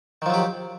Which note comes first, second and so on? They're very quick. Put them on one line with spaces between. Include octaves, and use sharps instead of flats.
D#3 F3 F#3 G4